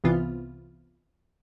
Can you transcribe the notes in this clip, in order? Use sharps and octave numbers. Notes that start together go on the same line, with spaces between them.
C2 C3 E3 B3 F4